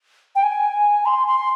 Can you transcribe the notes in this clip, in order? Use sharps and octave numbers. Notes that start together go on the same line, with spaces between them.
G5
G#5
C6
C6